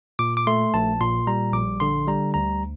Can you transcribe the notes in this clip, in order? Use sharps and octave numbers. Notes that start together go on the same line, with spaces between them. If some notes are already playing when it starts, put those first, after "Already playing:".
A#2 D6
D6
A3 C6
A#1 A5
A#2 C6
G3 A#5
A#1 D6
D3 C6
G3 A#5
D2 A#5